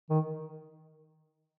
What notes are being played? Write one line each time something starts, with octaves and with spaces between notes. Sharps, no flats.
D#3